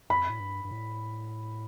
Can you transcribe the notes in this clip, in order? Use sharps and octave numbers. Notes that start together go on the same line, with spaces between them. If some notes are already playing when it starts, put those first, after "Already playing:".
F2 B5
A2
G2
G2
A2